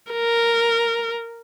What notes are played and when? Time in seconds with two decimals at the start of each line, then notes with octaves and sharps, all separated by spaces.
0.11 A#4